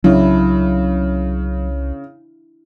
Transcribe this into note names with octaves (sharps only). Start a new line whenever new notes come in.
C2 C#3 F#3 D4 E4